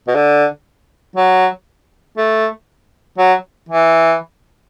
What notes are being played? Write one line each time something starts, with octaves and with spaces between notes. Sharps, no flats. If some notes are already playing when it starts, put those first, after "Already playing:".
B2
D3
F#3
A3
F#3
E3